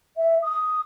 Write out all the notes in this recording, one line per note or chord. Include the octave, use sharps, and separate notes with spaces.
E5
D#6